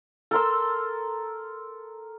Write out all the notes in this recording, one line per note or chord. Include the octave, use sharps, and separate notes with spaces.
A4 A#4 C6 E6